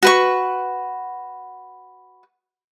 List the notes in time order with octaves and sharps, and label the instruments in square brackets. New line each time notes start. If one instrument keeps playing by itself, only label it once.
[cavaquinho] F#4 B4 C#6